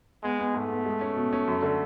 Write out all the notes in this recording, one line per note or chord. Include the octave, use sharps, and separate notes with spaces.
G#3 B3
B3
G#2 A3
B3
G#3
C#4
B2
C#4
F#2
D3